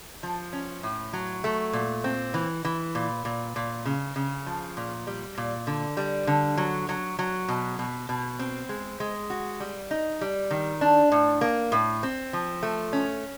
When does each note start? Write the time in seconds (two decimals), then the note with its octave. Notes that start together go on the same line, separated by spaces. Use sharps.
0.23 F3
0.53 C#4
0.83 A2
1.13 F#3
1.44 A3
1.73 A#2
2.04 C4
2.34 E3
2.65 E3
2.95 A#2
3.25 A#2
3.56 A#2
3.85 C#3
4.16 C#3
4.46 F3
4.77 A#2
5.07 G3
5.38 A#2
5.67 D3
5.97 G3
6.27 D3
6.58 F#3
6.89 F#3
7.19 F#3
7.48 B2
7.79 B2
8.09 B2
8.39 C4
8.69 G#3
9.00 G#3
9.30 F#4
9.60 G3
9.91 D#4
10.21 G3
10.51 D#3
10.81 D4
11.12 A2
11.41 A#3
11.72 A2
12.03 C4
12.33 F3
12.63 A3
12.93 C#4